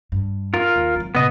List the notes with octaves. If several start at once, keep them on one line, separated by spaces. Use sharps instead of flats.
G2
F4 A#4
D#2
F#3 C4
A#2 C#3 B3 D#5